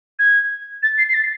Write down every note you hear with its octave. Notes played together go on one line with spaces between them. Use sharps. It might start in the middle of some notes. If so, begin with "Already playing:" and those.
G#6
A6
C7
C7
A6